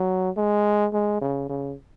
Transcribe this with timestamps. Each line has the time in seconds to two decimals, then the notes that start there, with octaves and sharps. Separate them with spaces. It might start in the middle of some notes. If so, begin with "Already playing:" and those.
Already playing: F#3
0.37 G#3
0.93 G#3
1.22 C#3
1.49 C#3